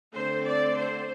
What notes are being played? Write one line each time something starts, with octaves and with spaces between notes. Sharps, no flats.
D3 A3 C4 C5
D5
C5